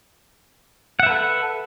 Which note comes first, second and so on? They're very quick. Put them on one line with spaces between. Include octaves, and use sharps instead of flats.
F#5 E5 B4 A4